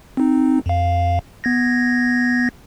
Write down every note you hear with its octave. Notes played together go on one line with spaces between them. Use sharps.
C4 D#4
F2 F5
B3 G#6 A#6